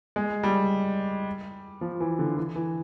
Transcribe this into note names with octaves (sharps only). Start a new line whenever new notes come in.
G#3
G3
F3
E3
D3
E3
E3